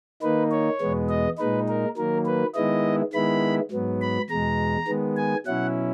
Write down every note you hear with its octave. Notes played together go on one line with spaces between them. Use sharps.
D#3 A#3 D#4 B4
C#5
E2 B2 G#3 B3
D#5
A#2 G#3 D#4 B4
A#4
D#3 F#3 A#3 A#4
B4
D#3 G#3 B3 E4 D#5
D#3 G#3 B3 E4 B5
G#2 F#3 B3
B5
E2 B2 G#3 A#5
D#3 G#3 B3
G#5
B2 F#3 C#4 E4 F#5